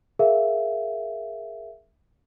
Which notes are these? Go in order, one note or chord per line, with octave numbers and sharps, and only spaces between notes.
G#4 A#4 E5 F5